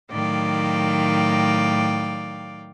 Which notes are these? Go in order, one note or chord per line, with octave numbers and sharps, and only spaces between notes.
A2 D#3 F#3 D5 F5 G5